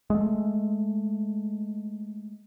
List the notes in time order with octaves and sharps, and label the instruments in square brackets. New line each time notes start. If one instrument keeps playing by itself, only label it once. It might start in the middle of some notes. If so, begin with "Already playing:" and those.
[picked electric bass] G#3 A3